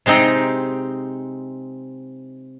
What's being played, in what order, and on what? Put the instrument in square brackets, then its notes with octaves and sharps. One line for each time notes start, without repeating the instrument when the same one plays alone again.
[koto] C3 G#3 C4 D#4 G5